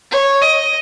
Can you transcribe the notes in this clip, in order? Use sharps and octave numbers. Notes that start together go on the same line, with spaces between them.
C#5
D#5